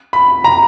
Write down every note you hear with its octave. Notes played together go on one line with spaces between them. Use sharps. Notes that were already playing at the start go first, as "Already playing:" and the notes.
B5
A#5